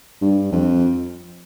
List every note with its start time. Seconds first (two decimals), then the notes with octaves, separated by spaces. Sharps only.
0.21 G2
0.52 F2